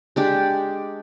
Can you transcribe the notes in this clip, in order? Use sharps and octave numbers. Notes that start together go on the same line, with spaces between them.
G#3 D4 G4